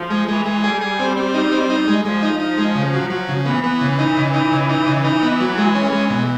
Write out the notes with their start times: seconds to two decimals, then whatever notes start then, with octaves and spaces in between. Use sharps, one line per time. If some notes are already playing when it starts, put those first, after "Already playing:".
Already playing: F3
0.10 G#3
0.28 E3 G#3
0.45 G#3
0.63 G3 G#4
0.81 G#4
0.99 C4
1.17 C4
1.34 D#4
1.52 C4
1.70 D#4
1.88 G#3
2.04 F3 G#3
2.23 D#4
2.40 D#4
2.58 G#3
2.75 C#3
2.94 F#3
3.10 F#3
3.29 C#3
3.45 E3 B3
3.64 B3
3.81 C#3
3.99 D#4
4.17 C#3
4.34 D#4
4.51 C#3
4.69 D#4
4.87 C#3
5.04 D#4
5.23 B3
5.40 F#3
5.57 G#3
5.75 C#4
5.93 G#3
6.10 B2